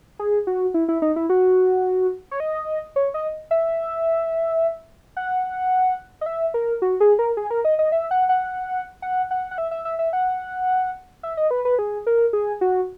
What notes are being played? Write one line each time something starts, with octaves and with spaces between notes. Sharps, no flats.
G#4
F#4
E4
E4
D#4
E4
F#4
C#5
D#5
C#5
D#5
E5
F#5
D#5
E5
A#4
F#4
G#4
A#4
G#4
A#4
D#5
D#5
E5
F#5
F#5
F#5
F#5
F#5
E5
E5
E5
E5
F#5
E5
D#5
B4
B4
G#4
A#4
G#4
F#4